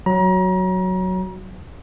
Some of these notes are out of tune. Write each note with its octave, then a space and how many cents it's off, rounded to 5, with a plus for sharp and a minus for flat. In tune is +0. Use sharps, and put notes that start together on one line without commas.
F#3 +0 A#5 +35